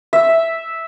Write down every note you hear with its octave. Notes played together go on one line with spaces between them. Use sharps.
E5